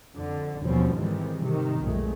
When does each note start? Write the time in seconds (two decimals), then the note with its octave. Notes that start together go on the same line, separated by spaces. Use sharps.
0.14 F2 D3
0.64 D#2 B2 F3 G3 C4 C#4
0.93 G#2 C3 D#3 E3 G3 G#3
1.42 C3 D#3
1.82 B1 F2 A#2 G#3 A3